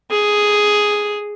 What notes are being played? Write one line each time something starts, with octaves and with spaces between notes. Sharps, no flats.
G#4